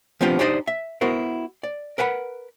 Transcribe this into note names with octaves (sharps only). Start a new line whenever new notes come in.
F3 B3 C4 D4 F4 G4
D4 D#4 G4 C5 D5 D#5
E5
B3 E4 F#4 A#4 C5
D5
A#4 B4 F#5 G#5 B5